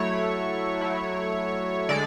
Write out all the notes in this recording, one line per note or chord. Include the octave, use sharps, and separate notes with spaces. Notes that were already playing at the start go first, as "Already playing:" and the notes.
Already playing: F#3 A3 E4 C#5
F#3 A3 E4
D3 G#3 D5